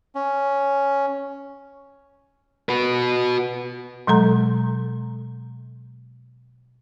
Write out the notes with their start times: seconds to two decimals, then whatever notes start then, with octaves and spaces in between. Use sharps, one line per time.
0.15 C#4
2.69 F#4 B4
4.07 B2 F#3 G#3 A4 A#5